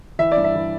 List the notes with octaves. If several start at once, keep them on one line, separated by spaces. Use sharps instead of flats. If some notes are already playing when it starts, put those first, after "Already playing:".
E3 E5
D5
G2
E5
E3